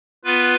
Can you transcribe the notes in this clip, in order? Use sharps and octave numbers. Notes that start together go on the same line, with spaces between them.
B3 F4 B4